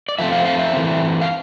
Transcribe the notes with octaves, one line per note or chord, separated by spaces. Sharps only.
D5
A2 F3 A3 C4 E5
F5
F5
E5
E3 A3 C4
F5